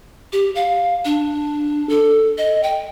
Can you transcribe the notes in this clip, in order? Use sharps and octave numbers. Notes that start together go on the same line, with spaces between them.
G4
F5
D4
A4
D#5
G5